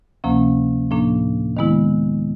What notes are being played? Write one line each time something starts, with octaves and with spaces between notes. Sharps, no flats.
D2 C3 F3 A#3 C#4
A2 F3 A#3 D4
D#3 G#3 B3 E4